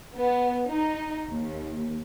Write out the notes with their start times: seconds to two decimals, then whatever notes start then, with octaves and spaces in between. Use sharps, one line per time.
0.18 B3
0.71 D#4
1.30 D#2